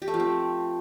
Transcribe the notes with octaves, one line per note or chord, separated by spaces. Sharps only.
G4
A3
F3
C4